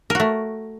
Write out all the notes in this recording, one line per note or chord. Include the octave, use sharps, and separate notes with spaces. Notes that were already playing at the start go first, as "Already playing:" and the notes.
A3 F#4 A#4